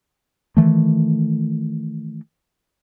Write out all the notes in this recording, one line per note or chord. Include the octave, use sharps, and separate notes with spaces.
D#3 E3 A3